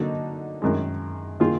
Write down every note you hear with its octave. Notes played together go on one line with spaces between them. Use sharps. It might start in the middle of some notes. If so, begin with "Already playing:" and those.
Already playing: D3 F#3 A#3 D#4 F#4
F#2 D#3 G#3
D#3 A#3 F4 G#4